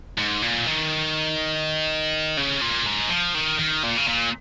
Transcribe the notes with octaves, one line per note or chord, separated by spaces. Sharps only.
G#2
A#2
D#3
C#3
A#2
G#2
F3
D#3
D#3
A#2
C#3
A#2